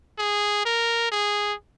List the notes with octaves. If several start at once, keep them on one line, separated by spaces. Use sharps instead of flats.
G#4
A#4
G#4